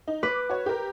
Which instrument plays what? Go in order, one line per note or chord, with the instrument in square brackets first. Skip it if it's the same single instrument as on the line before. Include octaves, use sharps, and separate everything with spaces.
[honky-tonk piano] D#4
[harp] B4 [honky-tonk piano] D6
[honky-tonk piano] F#4 C#5
G4 A#4